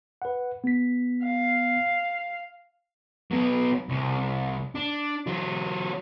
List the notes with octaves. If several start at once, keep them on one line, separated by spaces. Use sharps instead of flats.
B4 F#5
B3 B6
F5
F#3 B3
C2
D4
F#3 F4